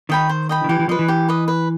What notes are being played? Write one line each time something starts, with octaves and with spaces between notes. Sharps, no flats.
D#3 D#5 G5 B5
C5
D#5 G5 B5
D#3
E3 G4
E3
F3 B4 D#5
E3
G4
B4 D#5
B4